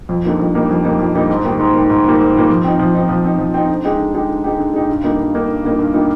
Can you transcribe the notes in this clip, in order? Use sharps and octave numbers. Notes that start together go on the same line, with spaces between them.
F2
D3 G3 A#3 D#4
F2
D3 G3 A#3 D#4
F2
D3 G3 A#3 D#4
F2
D3 G3 A#3 D#4
G#2
D#3 G3 A#3
G#2
D#3 G3 A#3
G#2
D#3 G3 A#3
G#2
D#3 G3 A#3
F3
C4 D#4
F3
C4 D#4
F3
C4 D#4
F3
C4 D#4
D3
G#3 D#4 G4
D3
G#3 D#4 G4
D3
G#3 D#4 G4
D3
G#3 D#4 G4
G2
D3 G3 A#3 D#4
G2
D3 G3 A#3 D#4
G2
D3 G3 A#3 D#4
G2
D3 G3 A#3 D#4